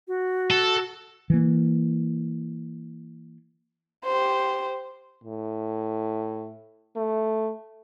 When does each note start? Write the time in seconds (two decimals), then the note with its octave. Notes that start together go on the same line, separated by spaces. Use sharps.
0.08 F#4
0.51 A4
1.30 E3 A#3
4.05 G4 C5
5.24 A2
6.96 A3